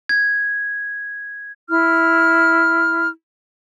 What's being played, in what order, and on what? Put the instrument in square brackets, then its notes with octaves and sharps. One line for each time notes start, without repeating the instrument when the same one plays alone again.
[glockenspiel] G#6
[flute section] E4 F6